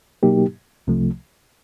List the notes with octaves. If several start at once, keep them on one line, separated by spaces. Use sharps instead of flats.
B2 F#3 A#3 D#4 G4
C2 C3 F3 A3